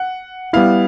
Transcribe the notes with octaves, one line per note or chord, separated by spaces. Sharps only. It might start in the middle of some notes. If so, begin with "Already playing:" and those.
Already playing: F#5
G3 B3 E4 F5